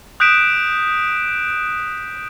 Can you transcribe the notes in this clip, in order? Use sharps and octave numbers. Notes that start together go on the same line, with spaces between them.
D#6 F#6 G6 B6 D7 E7